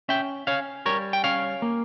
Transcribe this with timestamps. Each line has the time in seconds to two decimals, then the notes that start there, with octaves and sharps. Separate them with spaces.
0.09 C#4 E5 G5
0.47 C#4 C#5 F5
0.86 G3 A#4 C#5
1.13 G5
1.24 C#4 C#5 F5
1.62 A#3